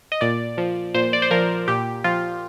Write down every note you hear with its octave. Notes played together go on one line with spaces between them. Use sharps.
D#5
A#2 D5
F3
A#2 C5
D5
C5
F3 A#4
A#2 G4
F3 F4